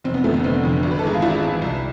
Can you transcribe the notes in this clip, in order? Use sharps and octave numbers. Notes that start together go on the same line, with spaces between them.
F1 C4
B3
F2 D3 A3
B3
F1 C4
F2 D3
G#1
B4
A4
G#2 E3 G#4
F4
G#1 E4
G#2 E3
C2